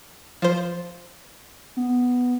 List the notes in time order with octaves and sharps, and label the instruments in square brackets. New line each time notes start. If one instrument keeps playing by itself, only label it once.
[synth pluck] F3 C5
[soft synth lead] B3